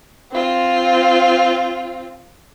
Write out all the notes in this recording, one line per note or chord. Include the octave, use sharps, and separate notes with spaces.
C4 F4